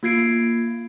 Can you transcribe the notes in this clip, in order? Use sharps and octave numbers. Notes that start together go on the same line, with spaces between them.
A#3 F4 G#6 C7 D7